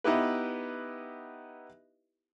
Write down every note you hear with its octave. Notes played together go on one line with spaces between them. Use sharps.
B3 D#4 E4 G4 B4